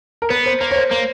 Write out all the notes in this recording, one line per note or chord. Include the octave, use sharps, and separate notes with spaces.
A#4
B3 B4
C5
A#3 C5
C#5
C5
A#3 C5